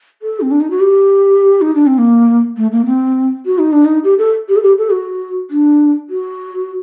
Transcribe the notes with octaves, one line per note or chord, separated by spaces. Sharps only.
A4
C4
D4
D#4
F#4
G4
D#4
D4
C4
A#3
A3
A#3
C4
F#4
D#4
D4
D#4
G4
A4
G4
A4
G4
A4
F#4
D4
F#4